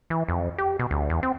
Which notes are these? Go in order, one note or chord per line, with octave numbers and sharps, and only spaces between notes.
E3
F2
G4
B2
D2
E2
C4